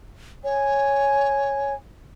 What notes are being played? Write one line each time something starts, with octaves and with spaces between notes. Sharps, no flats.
C#5 G#5